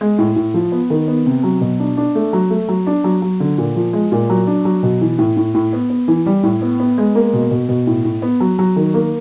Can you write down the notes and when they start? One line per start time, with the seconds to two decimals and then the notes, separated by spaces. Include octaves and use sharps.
0.01 G#3
0.18 A2
0.36 A2
0.54 F3
0.72 B3
0.90 D#3
1.08 B3
1.26 C3
1.43 F#3
1.61 B2
1.79 D4
1.97 D4
2.15 A3
2.33 F#3
2.50 A3
2.68 F#3
2.87 D4
3.04 F#3
3.22 F#3
3.40 D3
3.58 A#2
3.76 F3
3.93 G#3
4.12 A#2
4.30 F#3
4.47 D4
4.65 F#3
4.83 B2
5.01 E3
5.19 A2
5.37 A2
5.54 A2
5.73 B3
5.90 B3
6.08 E3
6.26 G3
6.43 A2
6.62 B3
6.80 B3
6.98 G#3
7.15 A#3
7.33 B2
7.51 B2
7.69 B2
7.87 A2
8.05 A2
8.22 B3
8.40 F#3
8.59 F#3
8.76 D#3
8.94 A#3